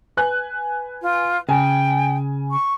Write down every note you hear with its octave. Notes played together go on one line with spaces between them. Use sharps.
B4 G#5 F#6
F4
C#3 G5 G#5
C#6